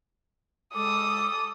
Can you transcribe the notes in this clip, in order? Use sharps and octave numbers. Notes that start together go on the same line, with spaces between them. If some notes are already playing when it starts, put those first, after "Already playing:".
G#3 A4 D6 D#6